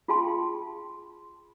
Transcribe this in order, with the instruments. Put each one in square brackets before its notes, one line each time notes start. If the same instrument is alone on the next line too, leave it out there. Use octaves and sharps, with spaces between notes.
[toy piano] F4 G#4 F5 G5 A5 C6